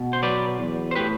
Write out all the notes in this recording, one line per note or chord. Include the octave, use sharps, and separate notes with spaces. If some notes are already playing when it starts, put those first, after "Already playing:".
Already playing: B2
C5
F#3 B4 D5
E2
C5
A2 G4 B4